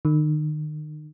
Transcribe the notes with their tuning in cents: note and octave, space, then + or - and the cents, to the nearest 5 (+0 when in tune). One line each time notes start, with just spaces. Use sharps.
D#3 -35